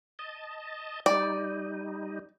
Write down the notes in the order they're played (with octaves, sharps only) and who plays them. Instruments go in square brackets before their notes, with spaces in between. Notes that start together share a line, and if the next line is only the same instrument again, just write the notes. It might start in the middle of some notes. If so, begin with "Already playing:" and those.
[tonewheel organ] D#5 A5
[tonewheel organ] G3 D#4 [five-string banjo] D5